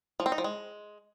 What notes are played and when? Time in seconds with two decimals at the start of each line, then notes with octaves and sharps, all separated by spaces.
0.20 F3
0.26 C4
0.32 D#4
0.38 F3
0.44 G#3